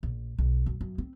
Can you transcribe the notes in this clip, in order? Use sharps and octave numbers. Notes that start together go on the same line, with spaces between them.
A#1
B1
F#2
F#2
C4